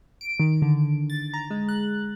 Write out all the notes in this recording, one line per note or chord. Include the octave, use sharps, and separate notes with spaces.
D7
D#3
D3
A6
A#5
G#3
F#6